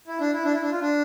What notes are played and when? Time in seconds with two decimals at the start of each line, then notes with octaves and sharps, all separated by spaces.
0.07 E4
0.20 D4
0.32 E4
0.45 D4
0.53 E4
0.62 D4
0.71 F4
0.81 D4